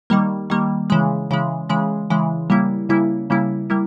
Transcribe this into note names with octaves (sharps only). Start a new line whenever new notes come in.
D#3 G3 A#3
D#3 G3 A#3
C#3 E3 G#3
C#3 E3 G#3
C#3 E3 G#3
C#3 E3 G#3
C#3 G3 A#3 E4
C#3 G3 A#3 E4
C#3 G3 A#3 E4
G3 A#3 E4